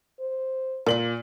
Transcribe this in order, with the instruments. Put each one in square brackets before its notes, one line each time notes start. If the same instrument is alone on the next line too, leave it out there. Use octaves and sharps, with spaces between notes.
[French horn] C5
[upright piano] A#2 F#7 [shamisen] A#4 D5